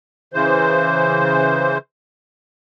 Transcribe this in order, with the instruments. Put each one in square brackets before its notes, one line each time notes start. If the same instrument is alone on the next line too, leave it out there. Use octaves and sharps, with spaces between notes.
[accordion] C#3 E3 C5